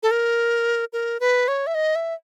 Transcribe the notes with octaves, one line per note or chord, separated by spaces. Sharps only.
A4
A#4
A#4
B4
C#5
E5
D#5
E5